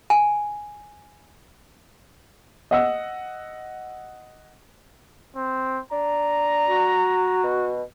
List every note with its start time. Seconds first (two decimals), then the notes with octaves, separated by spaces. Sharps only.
0.10 G#5
2.71 D#5 F#5 E6
5.36 C4
5.92 D4 A#5
6.68 F#4
7.44 B2